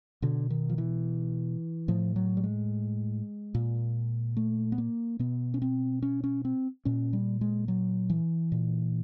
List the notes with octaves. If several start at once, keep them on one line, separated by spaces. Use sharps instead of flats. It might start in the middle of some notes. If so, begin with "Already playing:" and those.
B2 D3
D#3
F3
E3
A2 F3
F#3
G3
G#3
A#2
A3
B3
A#3
B2 B3
C#4
C4
C#4
C#4
C4
A#2 C#4
G3
G#3
F#3
E3
A#2